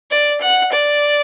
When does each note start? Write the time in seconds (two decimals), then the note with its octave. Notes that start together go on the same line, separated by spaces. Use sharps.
0.11 D5
0.41 F#5
0.72 D5